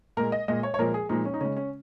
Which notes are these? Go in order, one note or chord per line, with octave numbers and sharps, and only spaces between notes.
A#2 G#3 A#4
D#5
A#2 G#3 D#5
C#5
C#5
A#2 F3 G#3 A#4
G#4
A#2 F3 G#3 D#4
C#4
D#4
C#3 G#3 C#4
C#4